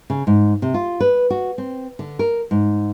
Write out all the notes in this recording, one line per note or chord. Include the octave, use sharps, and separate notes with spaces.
C#3
G#2
C3
F4
B4
F#4
C4
D3
A#4
G#2